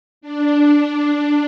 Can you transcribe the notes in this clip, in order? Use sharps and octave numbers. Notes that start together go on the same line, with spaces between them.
D4